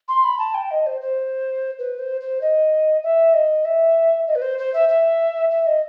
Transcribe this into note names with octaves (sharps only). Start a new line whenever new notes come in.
C6
B5
A5
G5
D#5
C5
C5
B4
C5
C5
D#5
E5
D#5
E5
D#5
B4
C5
C5
E5
E5
E5
D#5